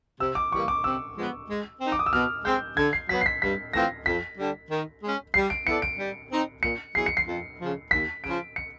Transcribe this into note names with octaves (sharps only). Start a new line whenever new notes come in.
C3 E6
D6
E3 G3 A#3 C#6
D6
C3 E6
F3 G#3 B3
G#3
C4 D#4
D6
D#6
E6
B2 F6
G#3 C4 G6
D3 G#6
C7
F#3 B3 B6
C7
B6
G2 B6
E3 A3 C4 F4 A#6
F2 B6
D3 G3
D#3
G#3 C#4
G3 C7
D7
B3 E4 A4 D5 C#7
D7
G3
C4 D#4
A#2 C#7
F#3 B3 E4 G#4 C7
C#7
C7
F2
C#3 F3
D#2 B6
C#3 F3 D7
C#7